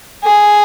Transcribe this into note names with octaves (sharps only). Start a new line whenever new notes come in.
G#4